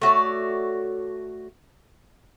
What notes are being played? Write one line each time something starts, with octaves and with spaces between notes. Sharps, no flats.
A3 F#4 C#5 D5